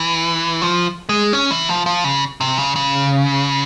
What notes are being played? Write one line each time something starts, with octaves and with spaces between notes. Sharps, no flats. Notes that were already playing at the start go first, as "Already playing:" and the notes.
Already playing: E3
F3
G#3
C#4
E3
F3
F3
C#3
C3
C#3
C#3